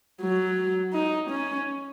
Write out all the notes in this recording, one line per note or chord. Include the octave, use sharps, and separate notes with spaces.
F#3
D#4
C#4